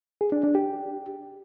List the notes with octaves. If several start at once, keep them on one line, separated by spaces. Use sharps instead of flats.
G#4
D4
D4
G4